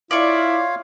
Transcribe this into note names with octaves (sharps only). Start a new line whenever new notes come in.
E4 F4 C#5 D5 F5 C#6